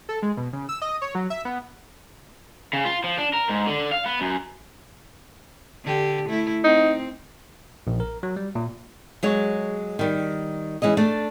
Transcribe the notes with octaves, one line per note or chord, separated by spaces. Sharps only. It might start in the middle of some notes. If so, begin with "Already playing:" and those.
A4
G#3
B2
C#3
E6
D#5
C#5
F#3
E5
B3
C#3
F4
F3
D4
A#4
G#2
D3
F5
B3
F#2
D3 G4
A3 E4
C4 D#4
A#1
A#4
F#3
G3
A#2
F#3 G#3 C#5
D#3 G3
E3 G#3 C#4 D#5
A3 D4